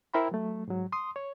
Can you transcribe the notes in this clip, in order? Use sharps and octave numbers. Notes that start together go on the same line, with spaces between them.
E4 A#4 C5 G5 A#5 B5
F#3 A3
G#2 F#3
C6 D#6
C#5